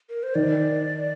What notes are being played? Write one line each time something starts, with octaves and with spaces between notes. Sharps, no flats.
A#4
C5
D#3 D5